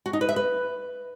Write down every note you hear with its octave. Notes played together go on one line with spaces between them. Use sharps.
F#4
D#4
B4
E5
B4